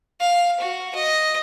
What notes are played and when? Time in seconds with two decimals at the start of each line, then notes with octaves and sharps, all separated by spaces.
0.21 F5
0.60 F#4
0.95 D#5